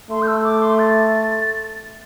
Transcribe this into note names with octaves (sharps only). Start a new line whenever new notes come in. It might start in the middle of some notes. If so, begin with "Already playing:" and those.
A3 C6
G6
E6
D6
C6
A6